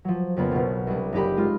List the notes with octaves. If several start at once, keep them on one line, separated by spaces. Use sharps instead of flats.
F3 F#3
F2 C#3 A#3 B3
B1 B2
C2 D4
F#1 D#4 G4 B5
G#3 F4